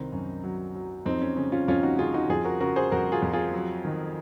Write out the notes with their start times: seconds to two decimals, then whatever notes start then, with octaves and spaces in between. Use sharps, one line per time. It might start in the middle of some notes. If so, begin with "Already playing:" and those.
Already playing: C2 D#3 C4 D#4
0.12 F#2
0.44 F#3
0.75 F#3
1.06 F2 C4 D#4
1.21 C#4
1.36 C#3 C#4
1.52 C#4 F4
1.68 F2 C#4 F4
1.83 D#4 F#4
1.99 C#3 F4 G#4
2.14 D#4 F#4
2.29 F2 F4 G#4
2.44 F#4 A#4
2.60 C#3 F#4 A#4
2.76 G#4 C5
2.92 F2 F#4 A#4
3.12 F4 G#4
3.22 F2
3.33 F4 G#4
3.53 F#3
3.85 D#3